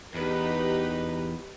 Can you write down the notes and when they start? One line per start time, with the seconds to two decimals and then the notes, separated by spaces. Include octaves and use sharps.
0.14 E2 D#4 G4 B4